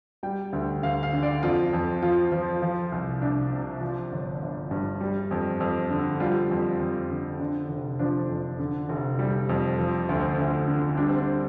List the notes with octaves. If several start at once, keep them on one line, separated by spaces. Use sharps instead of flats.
G3 G5
D2
D2 F5
F5
D3
D5
F2 F4
F2
F3 F4
F3
F3
C2
C2 D4
C3
F3
G1
G1
G2
G3
F2
F2
D3
G3 F4
F2
F2
D3
D3 D4
F1
F3 D4
F2
D3
F1
G3
F2
F3
D2
D2
D3
G3 D4
C4
D4